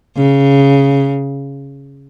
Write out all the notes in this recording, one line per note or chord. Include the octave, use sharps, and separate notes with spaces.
C#3